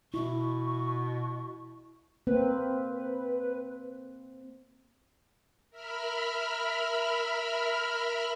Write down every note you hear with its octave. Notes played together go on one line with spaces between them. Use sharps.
B2 E4 C#6
A#3 C4 B4
A#4 E5 B5 F6